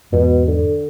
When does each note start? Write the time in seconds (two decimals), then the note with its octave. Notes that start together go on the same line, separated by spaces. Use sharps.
0.12 E2 G#2 B2
0.47 D3